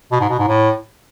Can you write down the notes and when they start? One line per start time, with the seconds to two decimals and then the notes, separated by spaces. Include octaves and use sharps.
0.12 B2
0.21 G#2
0.30 B2
0.39 G#2
0.48 A2